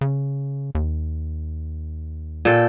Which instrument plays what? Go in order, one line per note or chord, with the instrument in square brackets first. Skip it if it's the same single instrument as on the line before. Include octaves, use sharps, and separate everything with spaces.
[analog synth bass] C#3
D#2
[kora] A#2 A4 G5